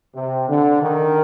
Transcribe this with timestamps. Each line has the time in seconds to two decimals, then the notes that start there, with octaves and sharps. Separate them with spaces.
0.15 C3
0.49 D3
0.83 D#3